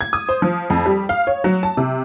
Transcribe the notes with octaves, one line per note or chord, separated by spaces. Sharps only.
G#6
D#6
C5
F3
F2
G3
F5
C#5
F#3
A5
C3